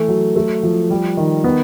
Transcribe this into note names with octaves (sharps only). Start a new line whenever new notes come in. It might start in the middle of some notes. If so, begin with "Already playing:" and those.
Already playing: E3 A3
F#3
A3
F3
G3
D#3
B3